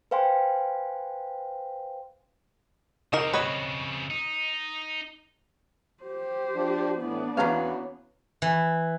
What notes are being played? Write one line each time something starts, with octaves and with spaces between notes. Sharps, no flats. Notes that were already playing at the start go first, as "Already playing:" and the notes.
B4 C5 F5 G5 G#5 C6
C#3 C4 D#4 A#4
B4 C#5 D#5
D#4
G4 C5
F3 D4
A2 E3 B3 D4
E2 E3 C#4 F#4 B4 C#5 F5 A#5
E3